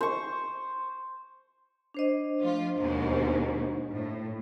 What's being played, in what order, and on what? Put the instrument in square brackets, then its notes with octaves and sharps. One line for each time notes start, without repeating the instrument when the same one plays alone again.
[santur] C5 C#6
[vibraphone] D4 C5 D#5
[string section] F3 A3 F4
D#2 G#2 B2
A2